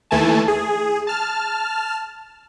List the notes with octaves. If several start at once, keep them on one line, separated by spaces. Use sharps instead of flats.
D#2 E3 A3 G#5 A5
G#4
A5 F6